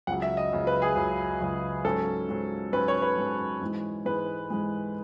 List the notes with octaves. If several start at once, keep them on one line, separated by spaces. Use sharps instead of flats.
C#2 C#3 F#3 F#5
E5
D#5
C#2 C#3 F#3
B4
G#4
C#2 C#3 F#3
C#2 C#3 F#3
G#2 F#3 C#4 A4
G#2 F#3 C#4
G#2 F#3 C#4 B4
C#5
B4
G#2 F#3 C#4
G#2 E3 G#3
G#2 E3 G#3 B4
G#2 E3 G#3